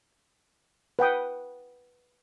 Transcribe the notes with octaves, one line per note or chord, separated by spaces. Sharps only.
B4 F#5 G5 D#6